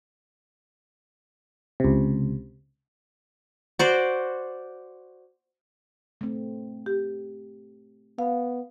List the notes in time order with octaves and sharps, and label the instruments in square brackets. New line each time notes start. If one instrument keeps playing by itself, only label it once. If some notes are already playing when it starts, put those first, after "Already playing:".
[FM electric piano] C#2 C3
[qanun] F#4 C5 D5
[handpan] A3 C4
[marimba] G4
[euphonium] B3 [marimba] F5